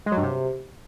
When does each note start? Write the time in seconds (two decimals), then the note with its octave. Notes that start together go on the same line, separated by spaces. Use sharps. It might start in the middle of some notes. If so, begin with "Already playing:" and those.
0.06 G#3
0.12 F#3
0.17 G2
0.23 C3